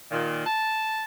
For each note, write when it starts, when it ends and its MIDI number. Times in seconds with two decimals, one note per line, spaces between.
0.11 0.43 46
0.11 0.43 51
0.46 1.05 81